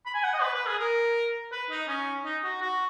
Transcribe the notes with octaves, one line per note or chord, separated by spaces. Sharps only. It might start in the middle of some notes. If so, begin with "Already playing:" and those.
B5
G#5
F#5
D#5
B4
B4
G#4
A#4
B4
D#4
C#4
D#4
F#4
F#4